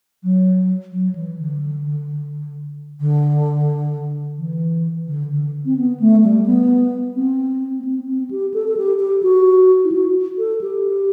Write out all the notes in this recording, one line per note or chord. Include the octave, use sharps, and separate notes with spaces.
F#3
F#3
E3
D3
D3
E3
D3
D3
C4
B3
A3
G3
B3
C4
B3
C4
C4
G4
A4
A4
G4
G4
F#4
E4
F#4
A4
G4